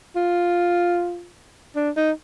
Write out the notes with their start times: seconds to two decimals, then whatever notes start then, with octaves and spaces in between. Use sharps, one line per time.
0.16 F4
1.76 D4
1.97 D#4